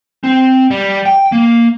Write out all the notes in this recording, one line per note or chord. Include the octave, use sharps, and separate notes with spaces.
C4
G3
G5
A#3